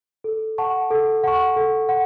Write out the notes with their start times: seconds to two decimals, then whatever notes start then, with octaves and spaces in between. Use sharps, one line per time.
0.24 A4
0.58 F#5 A5 C#6
0.91 A4
1.24 F#5 A5 C#6
1.56 A4
1.89 F#5